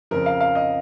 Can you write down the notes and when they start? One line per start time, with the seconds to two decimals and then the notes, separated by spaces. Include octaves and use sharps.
0.11 F2 C#3 F3 A#4
0.26 F5
0.41 F5
0.55 D#5